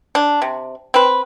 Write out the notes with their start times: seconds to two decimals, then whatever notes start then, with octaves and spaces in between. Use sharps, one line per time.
0.15 D4
0.42 C3
0.94 C4 B4